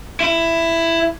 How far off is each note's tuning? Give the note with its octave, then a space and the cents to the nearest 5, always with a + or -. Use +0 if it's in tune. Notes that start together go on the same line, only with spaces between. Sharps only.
E4 +10